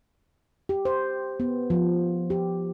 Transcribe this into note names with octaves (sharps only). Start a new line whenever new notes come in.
G4
C5
B3
F3
G4